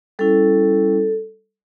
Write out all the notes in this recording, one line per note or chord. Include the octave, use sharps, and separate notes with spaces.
G3 C#4 E4 A4